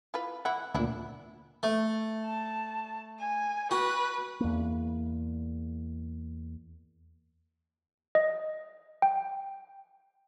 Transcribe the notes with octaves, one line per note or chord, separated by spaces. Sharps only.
E4 F4 B4
E3 E4 F#5
D2 A#2 D4 E4
A3
A5
G#5
F#4 B4
E2 A#3
D#5
G5